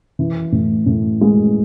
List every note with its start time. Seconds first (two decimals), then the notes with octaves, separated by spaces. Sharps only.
0.19 E3
0.52 A2
0.86 A2
1.21 G#3